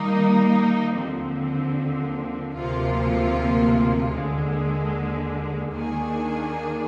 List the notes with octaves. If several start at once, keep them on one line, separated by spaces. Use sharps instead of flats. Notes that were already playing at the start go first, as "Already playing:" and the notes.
Already playing: D#3 G3 A#3 D#4
D#2 D3 F3 C4
D2 C3 F3 A#3 F4
D#2 D3 G#3
D#2 D#3 A#3 D4 G#4